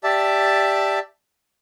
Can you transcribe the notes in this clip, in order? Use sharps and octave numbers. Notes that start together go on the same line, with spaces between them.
G4 D5 E5 A5